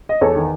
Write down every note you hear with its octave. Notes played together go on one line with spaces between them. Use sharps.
D#5
E2 A4 C#5
D#3